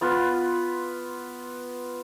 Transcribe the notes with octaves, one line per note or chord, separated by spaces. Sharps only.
B3 F4 B4